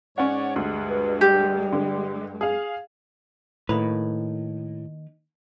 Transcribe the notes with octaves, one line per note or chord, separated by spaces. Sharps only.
G#2 C#4 C#5 D5 F#5
D2 G2 G#3
B4
G3 G4
D3
G#4 F5
A2 D#3 A#3 B4